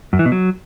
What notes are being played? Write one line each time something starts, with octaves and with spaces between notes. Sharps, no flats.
F#2
E3
B2
F#3